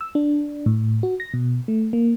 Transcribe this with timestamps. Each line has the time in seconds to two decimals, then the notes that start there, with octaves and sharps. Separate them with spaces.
0.01 E6
0.15 D4
0.66 A2
1.03 F#4
1.20 A#6
1.34 B2
1.68 A3
1.93 A#3